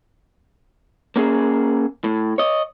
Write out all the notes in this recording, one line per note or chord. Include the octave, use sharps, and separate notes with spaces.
A#3 C#4 G#4
A2
C#5 D#5